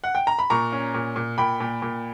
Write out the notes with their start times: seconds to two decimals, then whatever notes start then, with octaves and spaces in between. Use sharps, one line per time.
0.04 F#5
0.15 G5
0.27 A#5
0.39 B5
0.50 A#2 A#5 C#6
0.72 C#4
0.94 A#2
1.16 A#2
1.38 A#2 G5 B5
1.60 A#2
1.82 A#2